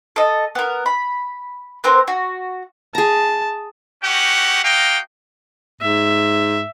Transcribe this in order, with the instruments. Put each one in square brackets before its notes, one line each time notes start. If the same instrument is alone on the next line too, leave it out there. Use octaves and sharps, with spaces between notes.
[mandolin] A4 D#5
B3 A#4
B5
B3 C4 A#4 C5
F#4
[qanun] G#4 A#5 [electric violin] A5
[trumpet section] C#4 D#4 F#4 G4 F#5
A#3 F#4 D#5 F5 G5
[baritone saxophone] G#2 [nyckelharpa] E5